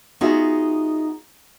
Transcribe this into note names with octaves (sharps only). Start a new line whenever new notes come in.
B3 D#4 F4 F#4 G#4 E5